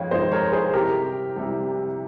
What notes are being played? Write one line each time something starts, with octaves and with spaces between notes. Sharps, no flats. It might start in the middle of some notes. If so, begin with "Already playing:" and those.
Already playing: F2 D#3 G#3 C#5 D#5 F5 G5
F2 D#3 G#3 C5 D#5
A#4 C#5
G#4 C5
C2 C3 G3 G4 A#4
C2 C3 G3